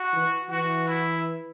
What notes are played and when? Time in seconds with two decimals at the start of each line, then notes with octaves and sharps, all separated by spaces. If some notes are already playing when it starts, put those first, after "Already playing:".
Already playing: F#4
0.13 E3
0.50 E3 F#4
0.88 E4